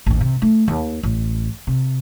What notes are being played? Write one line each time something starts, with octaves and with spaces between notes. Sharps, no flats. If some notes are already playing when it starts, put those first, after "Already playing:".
A1 D#2
C3
A3
D#2
A1
C3